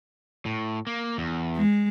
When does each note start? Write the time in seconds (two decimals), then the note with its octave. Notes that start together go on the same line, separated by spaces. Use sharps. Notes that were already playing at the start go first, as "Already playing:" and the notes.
0.46 A2
0.87 A#3
1.18 E2
1.56 G#3